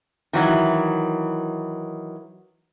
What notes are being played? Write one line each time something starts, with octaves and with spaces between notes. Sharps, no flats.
D#3 E3 F#3